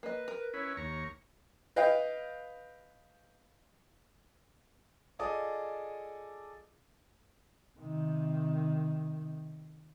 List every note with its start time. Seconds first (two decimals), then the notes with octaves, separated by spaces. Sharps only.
0.03 A#3 B4 D#5
0.28 A#4
0.54 C#4 E4 B4 C#5
0.77 D#2 A#5 C#6
1.76 B4 D#5 F5 G5
5.19 F4 G#4 A4 D5 D#5 D#6
7.78 C3 D#3